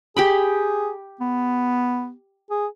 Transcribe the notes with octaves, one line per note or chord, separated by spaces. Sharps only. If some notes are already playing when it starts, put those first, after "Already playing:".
G4 G#4 G5 B5
B3
G#4